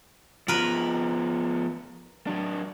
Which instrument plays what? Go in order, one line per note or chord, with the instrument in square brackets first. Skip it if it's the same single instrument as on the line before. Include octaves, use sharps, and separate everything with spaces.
[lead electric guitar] F3 B3 [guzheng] A#4 B4 B5
[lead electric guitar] F#3 D4